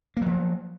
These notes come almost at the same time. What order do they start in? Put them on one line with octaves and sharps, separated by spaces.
A#3 F#3 F3